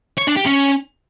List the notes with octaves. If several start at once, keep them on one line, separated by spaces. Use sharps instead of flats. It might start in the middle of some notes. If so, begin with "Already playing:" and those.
C#5
D4
G4
C#4